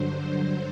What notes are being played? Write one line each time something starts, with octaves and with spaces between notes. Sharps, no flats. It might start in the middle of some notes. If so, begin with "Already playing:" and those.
Already playing: G2 D3 F#3 C5